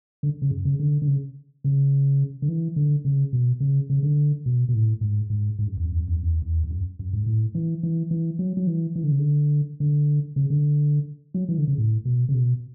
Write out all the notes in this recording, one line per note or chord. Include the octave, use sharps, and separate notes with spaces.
D3
C#3
F#2
C#3
D3
D3
C#3
C#3
D3
E3
D3
C#3
B2
C#3
C#3
D3
B2
B2
A2
G#2
G#2
G#2
F#2
E2
F#2
E2
F#2
E2
F#2
E2
E2
E2
F#2
F#2
G#2
A2
E3
E3
E3
F#3
F#3
E3
E3
D3
C#3
D3
D3
C#3
D3
F#3
E3
D3
C#3
A2
B2
C#3
B2